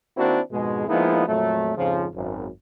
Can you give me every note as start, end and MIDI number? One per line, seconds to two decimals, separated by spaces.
0.16 0.40 51
0.16 0.40 58
0.16 0.40 60
0.16 0.40 62
0.16 0.40 64
0.16 0.40 66
0.51 0.86 41
0.51 0.86 44
0.51 0.86 47
0.51 0.86 56
0.88 1.26 53
0.88 1.26 56
0.88 1.26 58
0.88 1.26 59
0.88 1.26 63
0.88 1.26 64
1.27 1.73 41
1.27 1.73 46
1.27 1.73 54
1.27 1.73 57
1.77 2.06 41
1.77 2.06 44
1.77 2.06 49
1.77 2.06 53
2.14 2.47 32
2.14 2.47 42